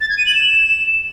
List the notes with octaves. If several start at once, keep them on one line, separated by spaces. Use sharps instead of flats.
A6
G#6
D#7
F#7
E7